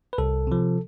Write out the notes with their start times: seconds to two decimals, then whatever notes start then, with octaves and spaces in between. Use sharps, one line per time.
0.13 B4
0.18 C2 A4
0.47 C3 F3